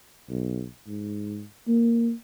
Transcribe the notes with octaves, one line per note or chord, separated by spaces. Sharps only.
B1
G#2
A#3